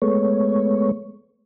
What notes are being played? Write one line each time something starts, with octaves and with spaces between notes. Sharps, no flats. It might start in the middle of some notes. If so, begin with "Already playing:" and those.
G#3 A3 B3 C#5